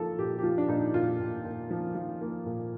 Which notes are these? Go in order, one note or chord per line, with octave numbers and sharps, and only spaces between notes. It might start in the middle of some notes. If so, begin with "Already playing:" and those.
Already playing: F3 A#3 A4
A#2 G4
G4
F3 F4
D4
A#2 D#4
A#2 F4
A#2
A#2
F3
F3
A#3
A#2